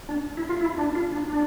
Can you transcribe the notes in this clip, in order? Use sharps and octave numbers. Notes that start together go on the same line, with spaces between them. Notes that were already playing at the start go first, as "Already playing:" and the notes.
D4
E4
F4
E4
D4
F4
D4
D4